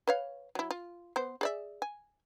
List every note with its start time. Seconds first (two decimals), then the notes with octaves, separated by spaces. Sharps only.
0.08 B4 C#5 F5
0.55 F#3 E4
0.71 F4
1.16 B3 C5
1.41 G#4 D5 E5
1.82 G#5